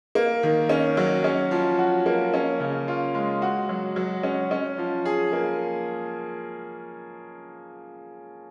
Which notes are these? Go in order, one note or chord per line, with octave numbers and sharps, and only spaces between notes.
A#3
D#3
C#4
F#3
C#4
F3
F#4
A#3
C#4
C#3
F4
G#3
F#4
F#3
F#3
C#4
C#4
F3
G#4
A#3